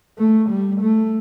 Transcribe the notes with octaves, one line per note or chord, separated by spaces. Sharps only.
A3
G3
A3